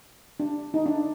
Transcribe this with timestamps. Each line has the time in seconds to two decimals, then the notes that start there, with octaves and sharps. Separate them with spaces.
0.40 D4
0.74 D#4
0.86 D4